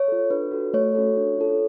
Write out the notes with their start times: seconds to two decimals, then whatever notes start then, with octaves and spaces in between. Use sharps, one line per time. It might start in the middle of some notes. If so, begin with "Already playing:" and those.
Already playing: C#5
0.08 F4 A4
0.30 D4 B4
0.51 F#4 A4
0.73 A3 C#5
0.95 C#4 F#4 A4
1.17 D4
1.38 F4 A4